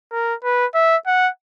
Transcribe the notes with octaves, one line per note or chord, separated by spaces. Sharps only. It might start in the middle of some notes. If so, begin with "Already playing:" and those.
A#4
B4
E5
F#5